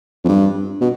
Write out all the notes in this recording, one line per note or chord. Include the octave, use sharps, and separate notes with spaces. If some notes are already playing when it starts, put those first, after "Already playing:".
F2
G2
B2